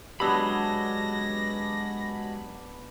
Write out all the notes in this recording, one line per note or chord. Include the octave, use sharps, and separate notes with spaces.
F#3 G#3 B3 D4 G4 B5 E6 A#6